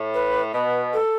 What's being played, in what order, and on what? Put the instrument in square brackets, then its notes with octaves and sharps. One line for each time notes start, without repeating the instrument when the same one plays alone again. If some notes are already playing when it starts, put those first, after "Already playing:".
Already playing: [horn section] A2
[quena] B4
[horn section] B2 [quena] B4
[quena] A4